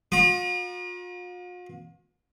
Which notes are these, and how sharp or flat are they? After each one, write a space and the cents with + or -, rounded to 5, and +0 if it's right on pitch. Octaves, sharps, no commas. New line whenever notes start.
F4 +45 A#5 +40 D#6 -45